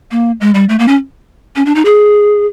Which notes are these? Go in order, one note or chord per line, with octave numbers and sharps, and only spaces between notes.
A#3
G#3
G3
A3
A#3
C#4
C#4
D4
D#4
G#4